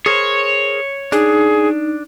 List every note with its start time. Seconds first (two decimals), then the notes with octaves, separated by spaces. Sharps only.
0.06 G#4 A#4 C5 C#5
1.12 D4 D#4 G#4